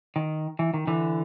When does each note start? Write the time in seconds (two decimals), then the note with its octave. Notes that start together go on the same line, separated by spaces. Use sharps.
0.16 D#3
0.59 E3
0.74 D#3
0.87 D3 E3